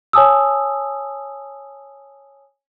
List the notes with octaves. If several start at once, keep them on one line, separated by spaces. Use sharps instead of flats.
C#5 G#5 A5 D#6 E6